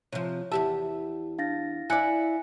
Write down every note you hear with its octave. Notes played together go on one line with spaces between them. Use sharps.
C3 F3 C#5
E2 G4 E5 A5
D4 F5 A6 A#6
E4 D5 G#5 F#6 C#7